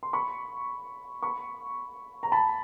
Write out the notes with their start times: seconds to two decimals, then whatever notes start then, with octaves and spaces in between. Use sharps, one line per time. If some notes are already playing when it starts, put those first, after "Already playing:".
0.03 C6
0.13 B5 C#6
1.23 B5 C#6
2.23 A#5
2.32 A5 B5